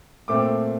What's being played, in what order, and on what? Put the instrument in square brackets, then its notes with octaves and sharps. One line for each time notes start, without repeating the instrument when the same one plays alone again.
[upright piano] A#2 A3 C4 D6